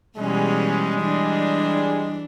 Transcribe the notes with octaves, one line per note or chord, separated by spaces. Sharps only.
B2 E3 G3 G#3 C#4
E3 D4